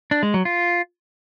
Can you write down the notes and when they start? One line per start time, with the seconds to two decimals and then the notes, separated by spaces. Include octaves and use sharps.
0.11 D4
0.23 G#3
0.34 F#3
0.45 F4